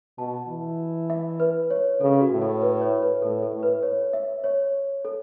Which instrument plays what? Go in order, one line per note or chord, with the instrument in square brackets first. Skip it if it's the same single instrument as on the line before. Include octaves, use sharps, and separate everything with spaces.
[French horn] B2 [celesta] A5
[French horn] E3
[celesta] E5
B4
C#5
[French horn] C#3 [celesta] A4
[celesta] F#4
[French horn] A2
[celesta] A4
B4
C#5
B4
[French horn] A2 [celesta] A4
[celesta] A4
[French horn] A2
[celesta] B4
C#5
E5
C#5
A4